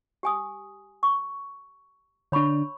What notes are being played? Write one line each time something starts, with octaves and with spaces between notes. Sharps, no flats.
G4 G#5 D#6
C#6
D3 D4 C#5 B5 C#6